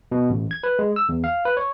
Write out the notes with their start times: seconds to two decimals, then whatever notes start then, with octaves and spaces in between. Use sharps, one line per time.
0.12 B2
0.30 A1
0.51 G#6
0.63 B4
0.79 G#3
0.96 E6
1.09 E2
1.24 F5
1.45 B4
1.57 C#5